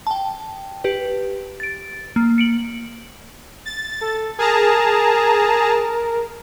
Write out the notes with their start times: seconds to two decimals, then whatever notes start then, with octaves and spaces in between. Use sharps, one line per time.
0.07 G5 A5
0.84 G4 B4
1.60 A6 D7
2.16 A#3
2.38 C#7 D7 F#7
3.66 A6
4.01 A4
4.39 G#4 A#4 A5 A#5